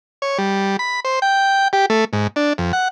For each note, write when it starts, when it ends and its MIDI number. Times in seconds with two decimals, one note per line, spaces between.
0.22 0.38 73
0.38 0.77 55
0.79 1.00 83
1.05 1.19 72
1.22 1.68 79
1.73 1.86 67
1.90 2.05 57
2.13 2.27 44
2.36 2.53 62
2.58 2.72 41
2.73 2.88 78